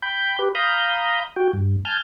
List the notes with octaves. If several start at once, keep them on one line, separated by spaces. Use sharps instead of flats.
G5 B5 G6
G4 B4
F5 A#5 B5 D#6 G6
F#4 G5
G2
G#5 A5 F6 G6